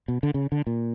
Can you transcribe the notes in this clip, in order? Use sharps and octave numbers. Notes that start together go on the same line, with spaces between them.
B2
D3
C#3
D3
A#2